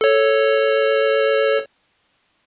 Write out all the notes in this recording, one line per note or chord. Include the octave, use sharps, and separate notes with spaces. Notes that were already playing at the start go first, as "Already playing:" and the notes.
A4 C#5